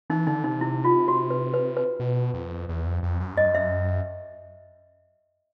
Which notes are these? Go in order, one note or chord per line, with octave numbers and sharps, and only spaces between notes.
E3 D#4
D3 D#4
C3 D#4
E4
F4
F#4
B4
B4
B4
B2
F2
E2
F2
F2
F#2
G2 D#5
F#2
E5